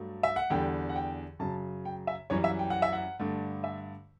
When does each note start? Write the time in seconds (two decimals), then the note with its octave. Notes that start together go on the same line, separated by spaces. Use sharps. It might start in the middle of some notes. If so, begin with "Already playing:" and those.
Already playing: G2 F#3 A3
0.23 E5
0.36 F#5
0.50 E2 D3 G3 G5
0.89 F#5
0.96 G5
1.39 F#2 C#3 F#3 A5
1.85 G5
2.07 E5
2.30 F#2 E3 G3 C#5
2.44 E5
2.59 G5
2.70 F#5
2.82 E5
2.93 F#5
3.19 G2 D3 A3
3.64 E5